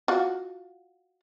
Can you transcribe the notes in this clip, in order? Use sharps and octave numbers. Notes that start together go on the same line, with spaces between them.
F4 F#4